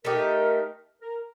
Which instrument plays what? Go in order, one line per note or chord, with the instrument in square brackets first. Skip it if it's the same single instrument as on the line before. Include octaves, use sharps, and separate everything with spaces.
[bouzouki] A3 D#4 G4 [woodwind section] A#4
[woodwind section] A#4